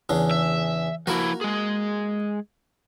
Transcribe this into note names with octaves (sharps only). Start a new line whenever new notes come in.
E2 C#3 D4
E5
F3 A#3 E4 F#4
G#3 G#4